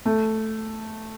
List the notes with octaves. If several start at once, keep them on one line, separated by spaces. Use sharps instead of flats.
A3